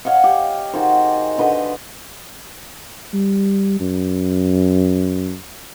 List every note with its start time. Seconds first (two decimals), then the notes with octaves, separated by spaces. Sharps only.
0.05 C#5 D#5 F5 F#5
0.24 G4
0.73 D#3 F#4 G#4 C5
1.38 D3 B4 C5 D#5
3.14 G3
3.80 F#2